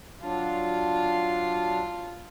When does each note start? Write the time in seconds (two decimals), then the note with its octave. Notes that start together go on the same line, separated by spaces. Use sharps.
0.22 F#3 D4 F4